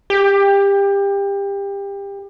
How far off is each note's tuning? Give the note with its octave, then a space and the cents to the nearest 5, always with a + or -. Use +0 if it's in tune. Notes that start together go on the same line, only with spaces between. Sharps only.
G4 +25